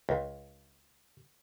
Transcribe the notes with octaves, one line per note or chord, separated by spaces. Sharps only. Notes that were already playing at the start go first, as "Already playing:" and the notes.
C#2